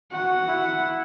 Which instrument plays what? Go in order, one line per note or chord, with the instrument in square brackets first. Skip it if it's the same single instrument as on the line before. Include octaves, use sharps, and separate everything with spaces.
[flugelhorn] F#4 [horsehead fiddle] F#5
[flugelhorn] E4